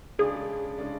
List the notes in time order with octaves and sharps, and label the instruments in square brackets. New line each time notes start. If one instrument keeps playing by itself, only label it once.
[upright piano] C#3 G#3 D4 [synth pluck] G#4
[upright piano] C#3 G#3 D4